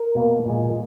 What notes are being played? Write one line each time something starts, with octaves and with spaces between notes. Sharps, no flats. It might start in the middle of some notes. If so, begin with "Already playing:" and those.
Already playing: A#4
B2 A#3
A#2 G#3